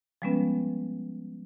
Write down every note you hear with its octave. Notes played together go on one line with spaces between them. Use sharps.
F3 G3 G#3 B3 C#4 B4